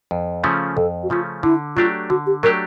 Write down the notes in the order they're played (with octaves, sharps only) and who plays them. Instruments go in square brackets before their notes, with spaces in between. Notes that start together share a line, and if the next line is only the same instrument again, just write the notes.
[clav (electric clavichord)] F2
C#3 F3 A3 C#4
[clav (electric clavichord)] F2 [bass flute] A4
[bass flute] F#4
[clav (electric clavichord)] C#3 F3 A3 C#4 [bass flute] F4
[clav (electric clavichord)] D3 [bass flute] E4
[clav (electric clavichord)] F#3 A3 D4 G4 [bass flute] F4
[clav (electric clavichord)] D3 [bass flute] F#4
[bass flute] G4
[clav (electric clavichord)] F#3 A3 D4 G4 [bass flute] A#4